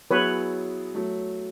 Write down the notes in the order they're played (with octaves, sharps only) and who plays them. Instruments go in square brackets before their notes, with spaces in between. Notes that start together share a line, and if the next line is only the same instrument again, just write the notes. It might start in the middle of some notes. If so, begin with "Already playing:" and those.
[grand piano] F#3 B3 E4 G#4 [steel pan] B4 C#5
[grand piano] F#3 A3